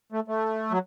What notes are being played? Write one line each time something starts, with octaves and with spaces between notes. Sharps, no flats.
A3
A3
F#3